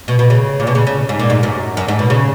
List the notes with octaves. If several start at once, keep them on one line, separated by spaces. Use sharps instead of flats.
B2
B2
C#3
A#2
B2
C#3
C#3
G#2
A#2
G#2
F#2
F#2
G#2
B2
C#3